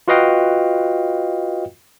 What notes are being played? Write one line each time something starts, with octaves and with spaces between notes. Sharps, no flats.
F4 F#4 B4 D#5 F5 G5